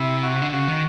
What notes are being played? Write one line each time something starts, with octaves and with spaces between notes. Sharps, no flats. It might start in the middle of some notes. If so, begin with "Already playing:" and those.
Already playing: C3 E4 E5
F#4 F#5
D3
C#3 F#4 F#5
D#3